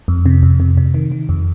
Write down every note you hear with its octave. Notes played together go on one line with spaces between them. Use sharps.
F2
C3
F2
C3
C3
D#3
D#3
F2